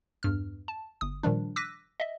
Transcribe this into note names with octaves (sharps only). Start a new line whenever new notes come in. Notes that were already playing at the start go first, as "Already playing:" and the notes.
E2 G2 F6
A5
G1 D#6
A#2 D#3 F3 G3 D4
D6 E6 F#6 A#6 B6 D#7
D#5 E5